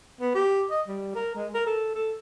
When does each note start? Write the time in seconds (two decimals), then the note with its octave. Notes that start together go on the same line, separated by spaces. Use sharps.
0.21 B3
0.35 G4
0.71 D#5
0.88 G3
1.15 A#4
1.35 G#3
1.55 A#4
1.67 A4
1.95 A4